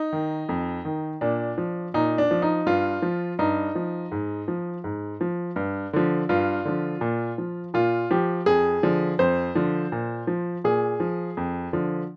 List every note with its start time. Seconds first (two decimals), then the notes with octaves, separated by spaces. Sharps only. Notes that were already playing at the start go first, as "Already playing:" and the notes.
Already playing: D#4
0.13 D#3
0.49 F2
0.85 D#3
1.21 A#2 D4
1.58 F3
1.94 A#2 D#4
2.18 D4
2.31 F3
2.42 D#4
2.66 G2 F4
3.02 F3
3.39 G2 D#4
3.75 F3
4.12 G#2
4.48 F3
4.84 G#2
5.21 F3
5.56 G2
5.93 D3 F3
6.29 G2 F4
6.65 D3 F3
7.01 A#2
7.38 F3
7.74 A#2 F4
8.11 F3 G4
8.46 F2 G#4
8.83 D3 F3
9.19 F2 C5
9.55 D3 F3
9.92 A#2
10.27 F3
10.64 A#2 G#4
11.00 F3
11.37 F2
11.73 D3 F3